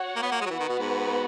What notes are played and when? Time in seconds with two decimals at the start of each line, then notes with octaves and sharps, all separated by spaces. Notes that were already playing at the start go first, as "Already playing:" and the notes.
Already playing: F#4 C#5 F#5
0.16 A#3
0.22 B3
0.32 A#3
0.41 G#3
0.46 F#3
0.50 E3 B3 F#4 B4 F#5
0.60 D#3
0.69 B2
0.79 G#2